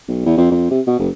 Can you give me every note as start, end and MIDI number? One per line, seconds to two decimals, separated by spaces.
0.08 0.25 35
0.26 0.33 40
0.37 0.49 41
0.51 0.70 41
0.71 0.81 48
0.87 0.95 47
0.99 1.09 30